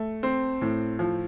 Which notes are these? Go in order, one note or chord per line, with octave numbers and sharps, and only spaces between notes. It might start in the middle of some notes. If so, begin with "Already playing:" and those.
Already playing: A3
C4
A2
F3